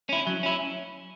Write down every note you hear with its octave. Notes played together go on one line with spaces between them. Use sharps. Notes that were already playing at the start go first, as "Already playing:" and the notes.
C#4 E4
F#3
C#4 E4